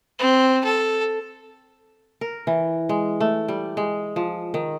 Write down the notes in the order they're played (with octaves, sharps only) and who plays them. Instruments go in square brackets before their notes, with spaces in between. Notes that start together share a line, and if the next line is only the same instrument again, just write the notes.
[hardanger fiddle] C4
A4
[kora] A#4
E3
G#3
A3
G3
G#3
F3
D#3